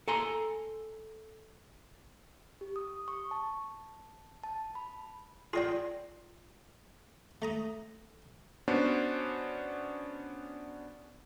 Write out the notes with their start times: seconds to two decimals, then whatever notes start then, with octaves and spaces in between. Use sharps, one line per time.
0.08 A4 G#5 A#5 C6
2.61 G4
2.76 D#6
3.08 C#6
3.31 A5
4.43 A5
4.75 B5
5.53 F4 G#4 C#5 D5 G5
7.42 A3 A#5 D#6
8.68 B3 C#4 D4 F#4 C5